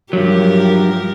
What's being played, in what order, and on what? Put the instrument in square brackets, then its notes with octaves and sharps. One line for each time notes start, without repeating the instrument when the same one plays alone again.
[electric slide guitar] G2 F#3 [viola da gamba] F3 G4 A#4